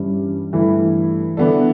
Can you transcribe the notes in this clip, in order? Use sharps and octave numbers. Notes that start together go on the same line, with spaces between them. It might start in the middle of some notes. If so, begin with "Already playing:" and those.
Already playing: G2 E3 G3 C#4 G4
G2 E3 A3 E4
E3 B3 D4 A4